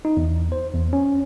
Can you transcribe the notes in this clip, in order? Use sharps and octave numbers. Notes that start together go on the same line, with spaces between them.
D#4
E2
C5
E2
C#4